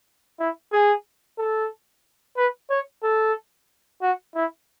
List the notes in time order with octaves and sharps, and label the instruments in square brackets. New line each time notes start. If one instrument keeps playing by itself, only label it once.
[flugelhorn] E4
G#4
A4
B4
C#5
A4
F#4
E4